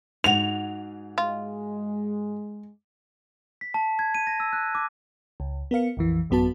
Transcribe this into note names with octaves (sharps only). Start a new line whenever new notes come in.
G#2 F#4 F#5 F7
G#3 F4
B6
A5
G#6
D#7
A#6
E6
F#6
D6
C#2
B3 A#4 F5 C#7
A#1 F2 E3
A1 F#2 B3 F#4 A5 B6